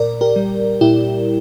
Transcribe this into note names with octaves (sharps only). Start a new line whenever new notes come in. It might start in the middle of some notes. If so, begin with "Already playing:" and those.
Already playing: A#2 A#4 D5
G4 A#4
G3
A#2 E4 G4